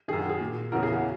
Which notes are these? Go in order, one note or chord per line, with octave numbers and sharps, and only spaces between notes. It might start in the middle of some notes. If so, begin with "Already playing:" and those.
F#2 D#3 G#4
F#4
G#4
A#2
E2 C#3 E3 F#4 A#4
G#4
F#4